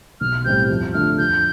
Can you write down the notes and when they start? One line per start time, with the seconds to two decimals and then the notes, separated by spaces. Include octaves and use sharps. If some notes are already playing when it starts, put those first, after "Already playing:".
0.21 B1 F6
0.45 A2 G3 C4 G4 G6
0.69 F2
0.93 D3 A3 D4 F4 F6
1.18 F2 G6